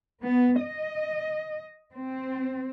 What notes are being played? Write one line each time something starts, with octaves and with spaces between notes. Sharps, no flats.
B3
D#5
C4